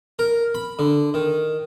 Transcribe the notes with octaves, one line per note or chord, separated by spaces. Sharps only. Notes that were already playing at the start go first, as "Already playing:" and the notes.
A#4
B5
D3
D#3